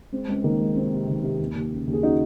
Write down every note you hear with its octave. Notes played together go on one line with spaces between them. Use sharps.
G#3 C4
C#2
D#3 A#3
G#3
C3 C4
C3
D#3
C3
D#2
D#2
C#3
D#2
G#4
C#3 D#4 F#4